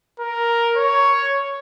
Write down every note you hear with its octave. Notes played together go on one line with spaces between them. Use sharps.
A#4
C#5